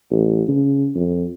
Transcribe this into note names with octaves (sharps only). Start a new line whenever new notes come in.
A1
C#3
F2